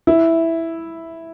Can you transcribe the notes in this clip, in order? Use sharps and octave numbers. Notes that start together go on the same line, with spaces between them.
E4